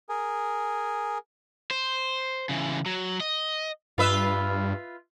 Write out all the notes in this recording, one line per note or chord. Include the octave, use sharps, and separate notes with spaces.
G#4 A#4 G#5
C5
C#3 E3
F#3
D#5
G2 F4 B4 E5